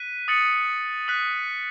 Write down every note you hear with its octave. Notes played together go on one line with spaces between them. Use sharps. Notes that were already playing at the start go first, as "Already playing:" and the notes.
Already playing: F#6 B6 D#7
D#6 A6 C#7 F#7
D#6 F#6 B6 F#7